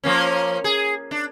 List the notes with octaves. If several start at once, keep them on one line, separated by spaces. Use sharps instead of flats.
F3 A#3 C#4
G#4
D4